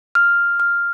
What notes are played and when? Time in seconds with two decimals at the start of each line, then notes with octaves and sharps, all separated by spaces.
0.15 F6
0.60 F6